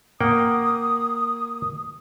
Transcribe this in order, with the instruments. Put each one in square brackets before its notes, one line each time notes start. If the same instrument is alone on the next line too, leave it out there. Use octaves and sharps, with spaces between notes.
[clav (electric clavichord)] A#3 F#5 G5 [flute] D#6